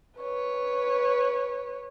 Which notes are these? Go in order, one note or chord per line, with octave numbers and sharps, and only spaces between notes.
B4 C#5